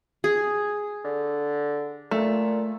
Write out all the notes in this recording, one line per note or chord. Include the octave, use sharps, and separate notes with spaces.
G#4
D3
A#2 A3